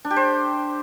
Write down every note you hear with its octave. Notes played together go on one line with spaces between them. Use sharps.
D4
G4
C5